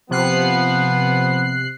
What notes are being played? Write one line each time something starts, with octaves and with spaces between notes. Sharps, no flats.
C3 F3 B3 F#6 C7